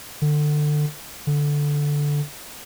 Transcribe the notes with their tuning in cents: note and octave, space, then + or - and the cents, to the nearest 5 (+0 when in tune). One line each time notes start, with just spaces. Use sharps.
D3 +25
D3 -5